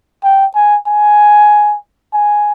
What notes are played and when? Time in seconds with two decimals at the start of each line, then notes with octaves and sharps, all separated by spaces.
0.24 G5
0.55 G#5
0.87 G#5
2.13 G#5